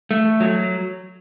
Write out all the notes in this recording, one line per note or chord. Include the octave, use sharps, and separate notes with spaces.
A3
F#3